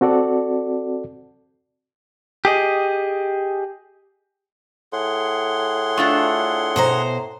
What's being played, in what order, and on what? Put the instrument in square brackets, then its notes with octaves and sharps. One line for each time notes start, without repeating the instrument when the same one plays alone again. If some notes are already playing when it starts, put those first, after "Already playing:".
[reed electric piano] C4 F#4 A4 D5
[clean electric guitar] G4 G#4 D#5
[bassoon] A2 [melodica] G#4 F#5 C6
[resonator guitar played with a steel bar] A3 D4 F4
[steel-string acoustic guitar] B2 C5 A#5